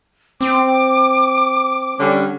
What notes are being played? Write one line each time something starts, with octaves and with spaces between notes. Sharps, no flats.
C4 D6
D3 G3 C#4